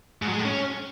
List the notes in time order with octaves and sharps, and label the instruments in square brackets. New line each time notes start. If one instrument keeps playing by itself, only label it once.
[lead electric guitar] G#2
F#3
G#3
A2
C#4